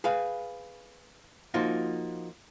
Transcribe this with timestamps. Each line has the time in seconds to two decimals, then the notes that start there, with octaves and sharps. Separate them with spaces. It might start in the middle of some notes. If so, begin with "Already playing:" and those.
0.04 G#4 B4 F5
1.54 F3 A#3 D#4 F4 F#4